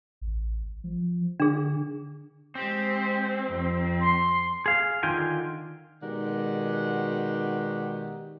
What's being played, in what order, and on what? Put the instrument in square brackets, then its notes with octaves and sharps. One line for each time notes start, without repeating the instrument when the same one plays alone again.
[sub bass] A1
F3
[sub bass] D3 [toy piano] D4 G#4
[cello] G#3 G4 [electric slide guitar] C4
[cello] F2
[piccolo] C6
[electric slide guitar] G#4 F5
D3 D#3 F4 G5 G#5
[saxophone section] B2 D#3 G#3 G4 D5 F#5